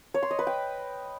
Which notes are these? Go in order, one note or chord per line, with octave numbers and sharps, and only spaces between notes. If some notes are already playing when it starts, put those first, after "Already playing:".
C#5
C6
D#5
B4
G5